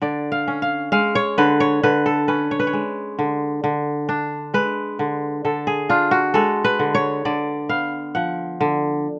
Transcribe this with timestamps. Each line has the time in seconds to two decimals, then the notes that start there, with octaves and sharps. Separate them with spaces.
0.02 D3 D5
0.32 F5
0.48 C#4
0.62 F5
0.92 G#3 F5
1.15 C#5
1.38 D3 B4
1.60 C#5
1.83 D3 B4
2.06 A4
2.28 C#4 B4
2.51 C#5
2.60 B4
2.67 C#5
2.73 G#3
3.19 D3
3.64 D3
4.09 D4
4.54 G#3 B4
4.99 D3
5.45 D3 A4
5.67 G#4
5.89 D4 F4
6.11 F#4
6.34 G#3 A4
6.64 B4
6.79 D3
6.95 C#5
7.25 D3 D5
7.69 B3 F5
8.15 F3 F#5
8.61 D3